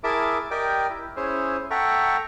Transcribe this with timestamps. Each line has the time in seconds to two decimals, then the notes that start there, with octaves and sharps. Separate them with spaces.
0.04 E4 G#4 A#4 E5 A5 D6
0.51 G4 A#4 D5 D#5 G5
0.90 E4
1.16 C#4 E4 G#4 C5 C#5
1.70 A4 E5 F#5 G5 A#5 C#6